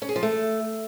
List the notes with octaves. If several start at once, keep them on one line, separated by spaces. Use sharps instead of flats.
C#4
G#4
F3
A3